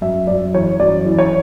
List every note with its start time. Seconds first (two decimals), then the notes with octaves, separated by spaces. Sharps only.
0.01 F#2 E5
0.27 F#2 D5
0.53 E3 C#5
0.80 F#2 D5
1.05 E3
1.19 C#5